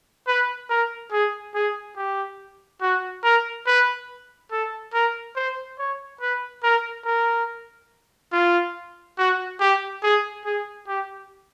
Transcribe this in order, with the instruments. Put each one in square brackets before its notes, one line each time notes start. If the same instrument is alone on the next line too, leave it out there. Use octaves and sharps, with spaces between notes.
[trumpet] B4
A#4
G#4
G#4
G4
F#4
A#4
B4
A4
A#4
C5
C#5
B4
A#4
A#4
F4
F#4
G4
G#4
G#4
G4